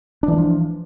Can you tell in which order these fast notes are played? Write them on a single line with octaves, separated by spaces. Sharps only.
D4 E3 G#3 F3